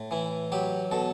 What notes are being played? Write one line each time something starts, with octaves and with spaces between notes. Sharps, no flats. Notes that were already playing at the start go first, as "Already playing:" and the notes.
Already playing: A2
E3 E4
F#3 G4
B2 A4